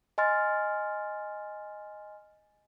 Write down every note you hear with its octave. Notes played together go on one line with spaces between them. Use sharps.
D#5 G#5 C6 F6 A6